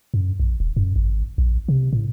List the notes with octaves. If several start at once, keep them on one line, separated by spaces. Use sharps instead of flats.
F#2
A#1
D#1
F#2
G#1
A#1
C3
A2